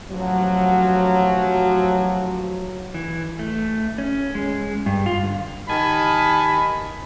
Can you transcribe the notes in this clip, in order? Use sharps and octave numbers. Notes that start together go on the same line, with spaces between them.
A1 F3 F#3
E3
A3
C#4
G#3
G2
F4
D3
D#3 G4 G#5 A5 B5